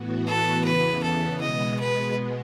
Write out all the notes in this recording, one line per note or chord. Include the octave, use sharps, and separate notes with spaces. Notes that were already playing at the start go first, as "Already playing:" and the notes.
Already playing: A2 E3 B3 F#4
A4
E2 C#3 E3 B3 B4
A4
B2 G#3 B3 D#5
B4